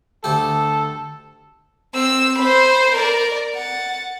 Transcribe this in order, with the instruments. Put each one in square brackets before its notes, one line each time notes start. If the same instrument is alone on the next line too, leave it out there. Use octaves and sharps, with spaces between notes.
[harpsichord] D2 G4 [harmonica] A4
[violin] C4 E6
C5 B5
A#4 D5
F#5 A6